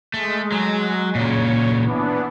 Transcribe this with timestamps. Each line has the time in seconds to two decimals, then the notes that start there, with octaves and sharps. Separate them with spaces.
0.14 G#3 A3
0.52 F#3
1.15 A#2 C#3 C#5
1.84 E3 B3 D4